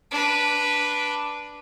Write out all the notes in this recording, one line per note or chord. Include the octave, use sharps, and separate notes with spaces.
D4 B4